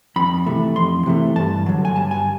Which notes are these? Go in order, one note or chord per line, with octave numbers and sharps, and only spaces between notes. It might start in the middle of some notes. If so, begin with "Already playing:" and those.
F2 B5
C3 E3 A3
F2 C6
C3 E3 A3
G2 A5
D3 F#3
G#5
G2 A5
G#5